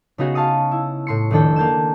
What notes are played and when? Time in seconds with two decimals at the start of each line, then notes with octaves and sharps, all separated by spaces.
0.18 C#3 B3 D#4 F#4 G#4
0.34 F5 A5 C#6 D#6 C#7
0.71 E4
1.07 A2 C6 C#7
1.31 F1 D#3 D4 A4 G5
1.56 A#3 A5 G6 E7